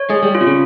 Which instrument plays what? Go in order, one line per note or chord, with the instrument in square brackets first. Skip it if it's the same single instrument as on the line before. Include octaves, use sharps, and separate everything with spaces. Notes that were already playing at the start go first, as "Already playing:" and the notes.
Already playing: [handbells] C#5
[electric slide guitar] G#3 [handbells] G#4
[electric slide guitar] G3
[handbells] F4
[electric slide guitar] C3
C#3